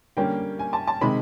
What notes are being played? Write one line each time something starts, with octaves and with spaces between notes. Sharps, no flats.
D3 G3 A#3 C#4 G5
G#5
A5
A5
C3 D#3 G#3 B5